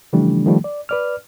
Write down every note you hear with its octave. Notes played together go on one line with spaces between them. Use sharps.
C#3 E3 F3 G3 A3 D4
D#3 F3 G3 A3
D5
B4 D5 F6